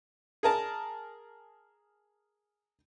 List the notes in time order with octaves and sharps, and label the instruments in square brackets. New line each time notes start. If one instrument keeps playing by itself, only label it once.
[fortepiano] G#4 A#4 A5